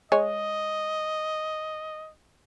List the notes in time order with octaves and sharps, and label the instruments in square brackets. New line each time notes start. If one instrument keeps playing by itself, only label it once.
[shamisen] G#3 C#5 G#5 [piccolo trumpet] D#5